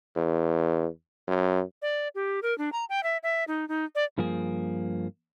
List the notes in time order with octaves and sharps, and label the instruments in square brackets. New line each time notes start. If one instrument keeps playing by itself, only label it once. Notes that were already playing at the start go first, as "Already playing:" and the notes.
[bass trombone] E2
F#2
[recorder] D5
G4
A#4
D4
A#5
G5
E5
E5
D#4
D#4
D5
[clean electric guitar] G2 F3 A#3 G#4